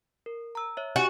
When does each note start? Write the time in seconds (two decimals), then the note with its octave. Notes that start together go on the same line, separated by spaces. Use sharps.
0.26 A#4
0.55 A#5 E6
0.77 C#5 E5
0.96 F#4 G4 G#5